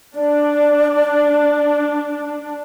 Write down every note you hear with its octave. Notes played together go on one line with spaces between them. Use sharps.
D4 D5